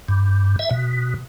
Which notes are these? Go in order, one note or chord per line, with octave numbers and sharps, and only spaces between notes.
G2
E5
B2